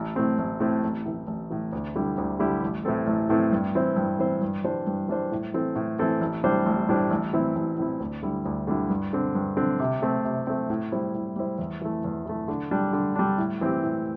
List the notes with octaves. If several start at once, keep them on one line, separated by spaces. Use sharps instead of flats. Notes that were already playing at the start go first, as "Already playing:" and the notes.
Already playing: A1
A2 A3 C4
A1
A2 A3 C4
A1
A2 E3
A1
A2 E3
D2
D3 G3 E4 G4
D2
D3 G3 E4 G4
A1
A2 E3 C4 A4
A1
A2 E3 C4 A4
G2
E3 C4 E4 C5
G2
E3 C4 E4 C5
G2
E3 G3 D4 C5
G2
E3 G3 D4 C5
A2
E3 C4 A4
A2
E3 C4 A4
A1
A2 G3 D4 C5
A1
A2 G3 D4 C5
A1
A2 E3 C4 E4
A1
A2 E3 C4 E4
D2
D3 G3 E4
D2
D3 G3 E4
G2
D3 C4
G2
D3 C4
C3
A3 C4
C3
A3 C4
A2
G3 E4 C5
A2
G3 E4 C5
E2
E3 A3
E2
E3 A3
D3
G3 D4
D3
G3 D4
A2
E3 C4 G4
A2